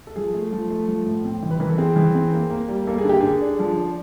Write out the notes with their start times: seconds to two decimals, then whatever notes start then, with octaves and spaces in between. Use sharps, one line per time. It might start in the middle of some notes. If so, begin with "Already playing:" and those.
0.07 A4
0.16 F3 G#4
0.34 A3
0.42 A4
0.52 F3
0.71 A3
0.88 F3
1.06 A2
1.24 C4
1.42 E3
1.51 B4
1.60 E3 A#4
1.69 A4
1.78 C4 G#4
1.96 E3
2.15 C4
2.33 A#3
2.51 A#3
2.69 G3
2.87 A#3 A4
2.98 G#4
3.04 D3
3.09 G4
3.21 D3 G#4
3.41 D4
3.59 F3
3.77 D4